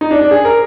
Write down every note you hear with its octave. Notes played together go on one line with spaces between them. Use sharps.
D#4
D4
D4
G#4
A#4